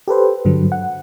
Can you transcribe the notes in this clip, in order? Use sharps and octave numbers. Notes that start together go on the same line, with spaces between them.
G4 A4 B4 C5
G2 D3 F#3
F#5